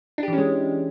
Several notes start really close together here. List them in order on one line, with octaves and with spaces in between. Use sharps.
D4 G4 E3 C#4 G#3